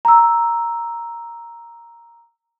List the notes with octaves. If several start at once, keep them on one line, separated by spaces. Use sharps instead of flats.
A#5 E6